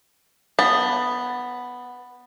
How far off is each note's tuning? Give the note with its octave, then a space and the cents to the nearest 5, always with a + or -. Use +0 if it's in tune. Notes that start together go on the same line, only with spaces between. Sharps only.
B3 +0 A5 +20